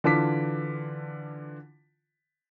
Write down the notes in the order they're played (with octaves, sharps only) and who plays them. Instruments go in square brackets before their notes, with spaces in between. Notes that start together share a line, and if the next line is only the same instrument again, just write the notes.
[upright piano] D3 E3 F4 A5 D6 B6